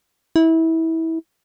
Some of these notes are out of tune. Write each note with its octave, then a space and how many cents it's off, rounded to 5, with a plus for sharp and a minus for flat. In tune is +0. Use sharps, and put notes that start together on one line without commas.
E4 -25